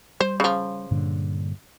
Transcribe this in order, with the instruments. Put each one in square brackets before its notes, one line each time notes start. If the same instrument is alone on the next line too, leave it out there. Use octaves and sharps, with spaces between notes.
[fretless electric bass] G3 [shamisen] C5
[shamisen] C#3 F3
[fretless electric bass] G2 A#2 D3